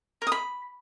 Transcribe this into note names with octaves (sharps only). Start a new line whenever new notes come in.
A#4
D#6
B5